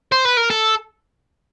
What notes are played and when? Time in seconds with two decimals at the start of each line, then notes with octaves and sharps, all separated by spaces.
0.12 C5
0.25 B4
0.37 A#4
0.50 A4